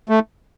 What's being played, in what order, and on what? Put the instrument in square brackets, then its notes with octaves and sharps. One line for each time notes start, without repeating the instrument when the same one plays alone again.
[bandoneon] A3